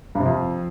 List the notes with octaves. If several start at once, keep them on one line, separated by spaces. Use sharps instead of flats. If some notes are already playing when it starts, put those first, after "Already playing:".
G2
C3
F2